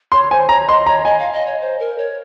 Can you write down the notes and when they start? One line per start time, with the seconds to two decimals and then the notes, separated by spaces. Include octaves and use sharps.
0.12 C#5 C6
0.31 C5 G#5
0.49 C#5 A#5
0.68 D#5 C6
0.86 C#5 A#5
1.05 D#5 G#5
1.19 F5
1.33 D#5
1.47 C#5
1.61 C5
1.79 A#4
1.98 C#5